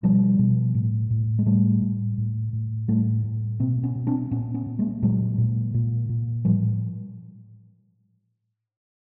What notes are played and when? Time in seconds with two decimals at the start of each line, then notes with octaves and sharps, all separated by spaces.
0.03 B2 F3 G3
0.39 B2
0.74 A2
1.10 A2
1.39 G#3
1.46 A2 G3 A3
1.82 A2
2.18 A2
2.53 A2
2.88 A2 G3 A3
3.24 A2
3.59 B2 A#3 C4
3.83 B3 C#4
3.95 B2
4.07 C4 D4
4.31 A#2 B3 C#4
4.54 B3 C#4
4.66 A#2
4.79 G#3 A#3
5.02 A#2 F#3 G#3
5.38 A#2
5.74 A#2
6.09 A#2
6.45 A2 F3 G3